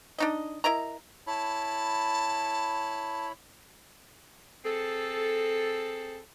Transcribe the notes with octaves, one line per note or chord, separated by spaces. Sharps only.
D4 D#4 D#5
E4 A#4 D#5 A#5
E4 C#5 A5 B5
C4 G#4 A4